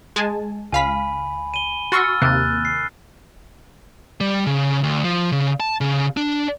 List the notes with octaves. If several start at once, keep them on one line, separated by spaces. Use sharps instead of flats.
G#3 G#5 A5
C#2 F5 G#5 B5 B6
D#7 G7
F#4 C6 C#6 E6 F6 A6
D#2 C3 A#3 F#6 A6
C7
G3
C#3
D2
F3
C#3
A5
C#3
D4